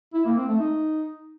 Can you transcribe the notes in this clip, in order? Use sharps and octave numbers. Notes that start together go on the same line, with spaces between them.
E4
A#3
C4
A3
D#4